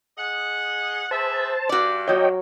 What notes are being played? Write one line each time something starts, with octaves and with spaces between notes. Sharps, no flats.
G#4 D#5 F#5
G#4 B4 C5 E5 A5
G2 F#4 D5
F#3 A#4 C#5 D#5 G5